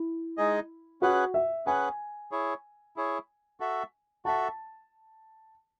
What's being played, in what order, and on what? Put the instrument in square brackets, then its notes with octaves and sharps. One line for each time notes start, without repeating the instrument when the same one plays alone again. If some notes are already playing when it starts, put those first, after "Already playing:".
Already playing: [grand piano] E4
[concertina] G#3 D#4 G#4 D#5
[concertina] C#4 G#4 B4 F#5 [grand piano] F#4
[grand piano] E5
[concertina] C#4 G#4 B4 F#5 [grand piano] G#5
[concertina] E4 G#4 C#5
E4 G#4 C#5
F#4 A4 E5
[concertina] F#4 A4 E5 [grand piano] A5